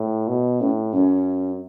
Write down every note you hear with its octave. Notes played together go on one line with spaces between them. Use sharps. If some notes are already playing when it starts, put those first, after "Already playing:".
Already playing: A2
B2
A2 C#4
F#2 C#4